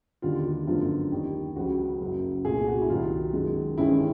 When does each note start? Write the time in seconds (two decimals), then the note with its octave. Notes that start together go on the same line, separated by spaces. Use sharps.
0.22 D#2 D3 G3 F4
0.44 F4
0.67 G1 F#2 D3 F3 A3 F4
1.11 D#2 D#3 G3
1.56 C#2 C#3 F3 F#4
2.00 F#1 F#2 C#3 F#3
2.45 C2 A#2 F#3 A3 G#4
2.67 F#4
2.81 E4
2.89 C2 C3 D#3 F#3 F4
3.33 F#2 D#3 G#3
3.78 A1 G2 D#3 G#3 C#4 E4